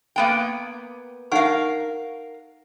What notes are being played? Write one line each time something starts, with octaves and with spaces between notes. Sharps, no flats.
A#3 B3 G5
D#4 A#4 F5 F#5 C#6